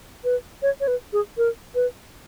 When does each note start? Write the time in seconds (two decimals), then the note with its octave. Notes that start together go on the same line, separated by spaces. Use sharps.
0.24 B4
0.62 C#5
0.80 C#5
0.88 B4
1.13 G#4
1.37 A#4
1.75 B4